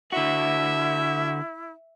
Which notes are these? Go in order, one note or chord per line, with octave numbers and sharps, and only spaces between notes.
D3 E4 F#4 E5